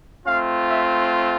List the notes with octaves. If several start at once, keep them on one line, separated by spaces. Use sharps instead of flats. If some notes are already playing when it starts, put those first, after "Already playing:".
A3 C4 F4 F5
E5